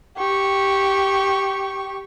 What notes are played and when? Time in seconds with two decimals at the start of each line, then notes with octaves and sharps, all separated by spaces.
0.17 G4 C#6